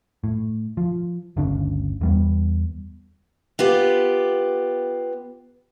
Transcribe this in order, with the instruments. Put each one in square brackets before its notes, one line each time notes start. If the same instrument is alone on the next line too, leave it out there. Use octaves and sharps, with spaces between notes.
[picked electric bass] A2
F3
G1 D2 C#3 D4
E2 G3 B3
[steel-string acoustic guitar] B3 F4 G4